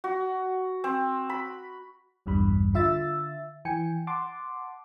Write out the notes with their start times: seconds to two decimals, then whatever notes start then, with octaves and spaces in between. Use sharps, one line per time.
0.04 F#4
0.84 C4
1.30 B5
2.26 A#1 E2 G2 G3 B5
2.74 D3 F4 E5 E6 A6
3.65 E3 G5 G#5 C#7
4.07 F#5 A5 C6 D6